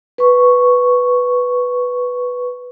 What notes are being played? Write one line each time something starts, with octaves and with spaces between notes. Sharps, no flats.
B4 C#6